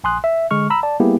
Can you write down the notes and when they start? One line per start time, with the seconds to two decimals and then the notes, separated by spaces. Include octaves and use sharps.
0.04 A#1 G#5 C6 D#6 F#6
0.24 E5
0.51 D3 G#3 C#6 F6
0.70 A#5 B5 E6
0.83 D5 A5
1.00 G3 A#3 B3 E4 G4 G#4